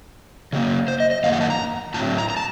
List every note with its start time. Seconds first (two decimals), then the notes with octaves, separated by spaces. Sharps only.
0.53 C#3 F#3 A#3
0.88 C5
1.00 D#5
1.11 D#5
1.23 F#2 D#3 A#3 F5
1.33 F#5
1.41 A5
1.50 A#5
1.94 A2 F#3 C4 A5
2.18 A#5
2.30 A#5
2.37 A5